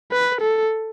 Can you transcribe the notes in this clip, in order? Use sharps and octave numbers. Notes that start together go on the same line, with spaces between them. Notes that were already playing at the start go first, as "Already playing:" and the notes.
B4
A4